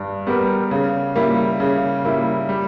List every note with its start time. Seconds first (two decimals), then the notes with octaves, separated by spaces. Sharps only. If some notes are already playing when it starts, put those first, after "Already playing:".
Already playing: G2
0.27 G3 B3 G4 A#4
0.71 C#3
1.16 G3 A#3 E4
1.60 C#3
2.04 G3 A#3 E4
2.49 G3